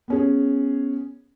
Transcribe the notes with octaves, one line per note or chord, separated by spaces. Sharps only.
B3 C#4 G#4